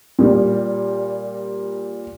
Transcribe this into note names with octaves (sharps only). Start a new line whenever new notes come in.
A#2 G3